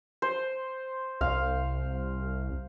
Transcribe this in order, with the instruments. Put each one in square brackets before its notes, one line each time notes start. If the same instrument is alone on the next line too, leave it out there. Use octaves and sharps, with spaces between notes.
[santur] C5
[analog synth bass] C2 [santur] F5